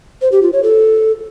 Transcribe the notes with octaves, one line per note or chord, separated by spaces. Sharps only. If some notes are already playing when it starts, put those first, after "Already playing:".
C5
G4
F4
C#5
A4